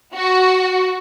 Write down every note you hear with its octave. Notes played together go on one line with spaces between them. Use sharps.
F#4